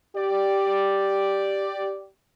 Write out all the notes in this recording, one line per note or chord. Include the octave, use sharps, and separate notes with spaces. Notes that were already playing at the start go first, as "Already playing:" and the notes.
G4 D5